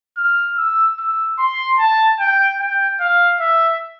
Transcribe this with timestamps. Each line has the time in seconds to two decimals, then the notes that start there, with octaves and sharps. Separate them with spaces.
0.17 F6
0.58 E6
0.99 E6
1.39 C6
1.78 A5
2.20 G5
2.60 G5
3.00 F5
3.40 E5